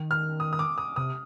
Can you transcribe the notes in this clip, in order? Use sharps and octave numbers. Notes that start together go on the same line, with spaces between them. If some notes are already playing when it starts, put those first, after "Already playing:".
Already playing: D#3
F6
D#6
D#6
D6
D#6
C3 D#6